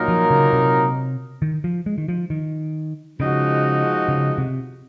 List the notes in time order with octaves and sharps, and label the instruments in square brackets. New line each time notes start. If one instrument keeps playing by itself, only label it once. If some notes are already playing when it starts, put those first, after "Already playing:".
Already playing: [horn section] A#2 F#3 A#3 D#4 A#4
[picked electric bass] F3
C#3
C3
D#3
F3
G#3
D#3
F3
D#3
[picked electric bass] C#3 [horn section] F3 G#3 D#4 F#4
[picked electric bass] C#3
C3